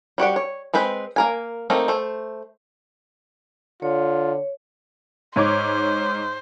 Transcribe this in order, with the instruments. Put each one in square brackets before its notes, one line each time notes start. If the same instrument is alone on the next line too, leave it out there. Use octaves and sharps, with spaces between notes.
[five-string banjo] G3 F#4 G4 F#5
C#5
G#3 C4 B4 C5
A#3 A#4 G#5
A3 A#3 C4 D#4
A3 C5
[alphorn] D3 [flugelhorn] F4 [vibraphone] C#5
[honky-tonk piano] G#2 C#5 D6 [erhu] C5